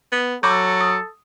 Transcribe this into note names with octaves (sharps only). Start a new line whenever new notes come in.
B3
F#3 A4 B5 D6 G6
D#6